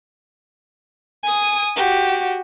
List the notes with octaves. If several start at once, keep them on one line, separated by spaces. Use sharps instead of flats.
G#5 D#6
F#4 G4